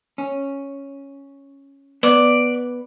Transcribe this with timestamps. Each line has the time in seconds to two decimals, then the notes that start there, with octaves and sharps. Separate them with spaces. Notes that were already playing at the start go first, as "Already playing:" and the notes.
0.18 C#4
2.03 B3 D5